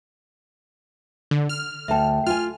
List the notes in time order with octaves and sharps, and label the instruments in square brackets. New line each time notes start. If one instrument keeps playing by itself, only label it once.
[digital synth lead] D3
F6
[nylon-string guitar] D2 A5 [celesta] E5 G5
[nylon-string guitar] F4 G#5 [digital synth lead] F6